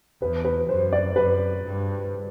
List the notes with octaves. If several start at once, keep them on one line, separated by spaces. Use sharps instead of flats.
E2 B4
B4
F#2 C5
D5
F#2 B4
G2